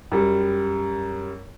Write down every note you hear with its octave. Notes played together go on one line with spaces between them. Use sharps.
F#2 G3